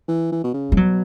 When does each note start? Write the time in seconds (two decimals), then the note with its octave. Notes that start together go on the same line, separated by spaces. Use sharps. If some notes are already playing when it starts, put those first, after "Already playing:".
0.09 E3
0.32 E3
0.44 B2
0.54 C#3
0.72 G#3
0.77 B2 F#3